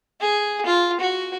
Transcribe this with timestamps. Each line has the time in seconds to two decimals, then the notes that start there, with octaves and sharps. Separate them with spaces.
0.21 G#4
0.66 F4
1.00 F#4